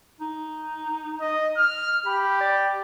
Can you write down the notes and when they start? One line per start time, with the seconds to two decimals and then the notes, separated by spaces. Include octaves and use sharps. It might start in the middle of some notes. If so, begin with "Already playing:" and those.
0.20 D#4
1.21 D#5
1.57 F6
2.06 G4 B5
2.41 D5